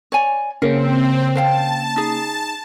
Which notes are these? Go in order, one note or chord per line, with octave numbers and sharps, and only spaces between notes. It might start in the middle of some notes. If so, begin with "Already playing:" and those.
C#5 D5 G#5
C#3 A#3 C4 C#4 A#4
C5 F5 G5 A5
D#4 G#4